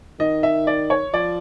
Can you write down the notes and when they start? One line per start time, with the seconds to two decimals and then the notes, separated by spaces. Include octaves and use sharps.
0.20 D#3 D#5
0.43 E5
0.67 D5
0.90 C#5
1.14 F3 D5